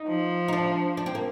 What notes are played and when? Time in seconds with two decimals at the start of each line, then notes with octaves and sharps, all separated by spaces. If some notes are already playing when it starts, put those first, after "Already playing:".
Already playing: D#4
0.08 F3
0.48 D#4
0.53 D4
0.97 D4
1.06 C4
1.15 A#3